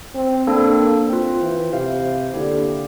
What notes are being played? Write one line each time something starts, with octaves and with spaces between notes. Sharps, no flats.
C4
A#3 D4 A4
A#3
C4 F4 C5 G5
E3
C3 E4 G4 C5 F5
D3 A#3 E4 G4